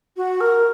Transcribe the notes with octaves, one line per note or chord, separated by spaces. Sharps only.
F#4
A#4